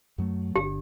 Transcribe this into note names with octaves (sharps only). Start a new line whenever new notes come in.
F#2 F#3 A3
G1 D3 G4